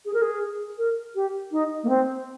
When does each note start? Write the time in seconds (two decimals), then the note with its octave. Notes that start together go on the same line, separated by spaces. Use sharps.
0.05 G#4
0.14 A#4
0.22 G#4
0.78 A#4
1.15 G4
1.52 D#4
1.83 A#3
1.89 C4